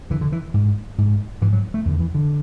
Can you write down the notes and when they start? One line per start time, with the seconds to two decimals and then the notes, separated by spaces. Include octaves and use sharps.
0.10 E2 D3 E3
0.21 D3
0.32 E3
0.54 G#2
0.98 G#2
1.41 G#2 E3
1.53 F#3
1.74 A3
1.85 E2 D3
2.00 E3
2.15 D3